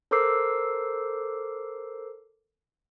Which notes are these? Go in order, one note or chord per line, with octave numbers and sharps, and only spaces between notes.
A4 A#4 C5 D6 E6 C7